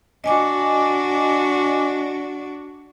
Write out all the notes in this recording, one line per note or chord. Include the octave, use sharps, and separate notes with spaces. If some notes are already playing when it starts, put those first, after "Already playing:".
D4 F#4 D#5 G#5 D6